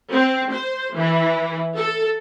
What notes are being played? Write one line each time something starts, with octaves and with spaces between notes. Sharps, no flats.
C4
C5
E3
A4